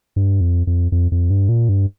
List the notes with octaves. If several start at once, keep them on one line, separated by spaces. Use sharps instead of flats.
G2
F2
F2
F2
F2
G2
A#2
G2